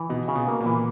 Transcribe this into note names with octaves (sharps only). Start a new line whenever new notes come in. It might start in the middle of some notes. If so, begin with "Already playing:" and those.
Already playing: E3
B2 D#4
C#3
B2
A#3
A#2
E3